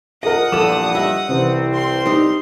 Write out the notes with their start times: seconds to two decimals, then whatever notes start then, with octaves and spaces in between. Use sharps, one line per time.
0.23 F4 G#4 A#4 D#5 F#5 D#6
0.52 E2 G2 A#2 F3 A4 D6 E7
0.95 G3 D#5 E5
1.29 C2 C3 E3 C4
1.74 C6
2.06 G3 D#4